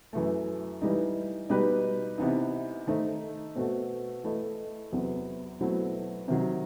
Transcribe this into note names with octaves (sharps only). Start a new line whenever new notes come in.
F#2 E3 A3
E3 G3 D#4
B2 G3 D#4 G4 B4
C3 E3 B3 D#4
D#3 A3 D#4 A4 C5
B2 A3 C4 F#4 A4
E3 A3 E4 A4 D#5
E2 C3 F#3 B3
B2 F#3 A3 C4 E4
C3 D#3 F#3